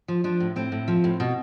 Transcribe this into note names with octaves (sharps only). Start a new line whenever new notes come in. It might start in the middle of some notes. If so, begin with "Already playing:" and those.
F3
F3 D4
A2
A2 C4
A2
F3
A2
B2